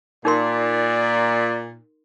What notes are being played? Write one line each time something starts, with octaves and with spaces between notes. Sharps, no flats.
A#2 D#4 A#4 D5 C6